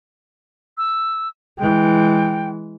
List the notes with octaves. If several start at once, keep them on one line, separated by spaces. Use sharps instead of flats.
E6
E3 G#3 G5